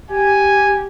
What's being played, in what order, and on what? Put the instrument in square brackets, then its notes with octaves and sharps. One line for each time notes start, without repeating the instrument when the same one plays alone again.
[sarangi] G4 [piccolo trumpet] G#5